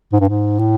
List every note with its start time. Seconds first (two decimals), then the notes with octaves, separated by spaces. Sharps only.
0.12 G#2
0.20 G2
0.29 G#2
0.59 A2